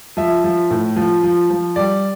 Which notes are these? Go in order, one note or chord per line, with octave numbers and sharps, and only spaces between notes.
F3 E5
F3
A2
F3
F3
F3
G3 D5